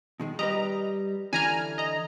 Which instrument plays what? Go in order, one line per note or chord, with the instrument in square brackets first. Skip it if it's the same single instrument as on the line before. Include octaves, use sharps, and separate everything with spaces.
[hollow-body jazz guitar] B2 D#3 G#3
[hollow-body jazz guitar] G3 G4 B4 [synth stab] D#5 A#5
[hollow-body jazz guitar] D3 E3 D4 [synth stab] G#5 A#5 F6
[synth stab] D#5 A#5